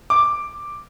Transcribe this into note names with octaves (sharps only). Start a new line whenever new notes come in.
D6